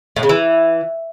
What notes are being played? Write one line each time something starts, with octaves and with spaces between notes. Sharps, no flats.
A2
C#3
E3